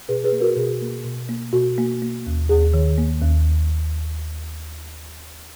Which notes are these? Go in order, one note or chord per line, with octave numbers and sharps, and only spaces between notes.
B2 G#4 B4
G#4 B4
A#3
F#4 A#4
B2 G#4
A#3
B2
A#3
B2 F#4
A#3
A#3
D#2
D#2 G#4
D#3
A#3
D#2